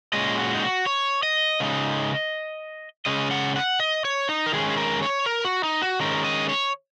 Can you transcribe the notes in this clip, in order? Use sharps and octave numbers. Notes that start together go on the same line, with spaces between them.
A#2 G#3 C#4 D#5
F#4
D#4
F#4
C#5
D#5
C#3 G#3 D#4
C#3 G#3 C#4 D#5
F#5
F#5
D#5
C#5
D#4
A#4
D#3 G#3 C#4 G#4
G#4
A#4
C#5
A#4
F#4
D#4
F#4
D#3 G#3 C#4 A#4
D#5
C#5